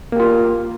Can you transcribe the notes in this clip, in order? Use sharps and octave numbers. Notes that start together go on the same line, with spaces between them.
A#3 F4 G4